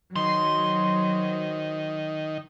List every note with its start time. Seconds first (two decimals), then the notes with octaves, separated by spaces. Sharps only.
0.16 D#3 F#3 C5 C6